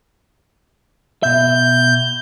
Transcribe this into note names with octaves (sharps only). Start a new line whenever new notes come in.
B2 E5 G6